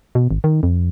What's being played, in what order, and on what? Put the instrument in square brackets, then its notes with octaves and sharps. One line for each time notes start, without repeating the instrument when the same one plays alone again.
[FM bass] B2
G#1
D#3
F2